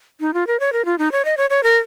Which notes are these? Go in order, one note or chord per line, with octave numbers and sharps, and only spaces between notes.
D#4
F4
A#4
C#5
A#4
F4
D#4
C#5
D#5
C#5
C#5
A#4